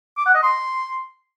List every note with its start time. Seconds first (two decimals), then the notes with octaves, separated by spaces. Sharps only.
0.17 D6
0.26 F#5
0.35 D#5
0.43 C6